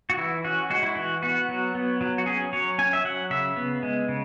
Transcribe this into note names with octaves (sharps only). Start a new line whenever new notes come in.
F#4
E3 E4
C#4 F#4
G#3 F#4
E4
E3 F#4
B3 F#4
F#3
B3
F#3
F#4
C#4 G#4
F#3 C#5
C#4 G#5
E5
F#3 F#5
C#3 E5
B3
G#3
C#3